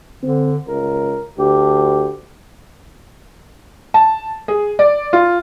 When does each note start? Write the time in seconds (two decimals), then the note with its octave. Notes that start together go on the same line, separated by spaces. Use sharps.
0.23 D3 C4
0.68 C#2 A#4
1.38 D2 G4
3.94 A5
4.48 G#4
4.79 D5
5.13 F4